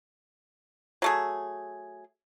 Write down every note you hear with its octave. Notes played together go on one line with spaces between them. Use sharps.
F#3 A3 G#4